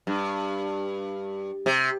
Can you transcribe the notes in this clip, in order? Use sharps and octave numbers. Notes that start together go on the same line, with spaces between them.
G2
C3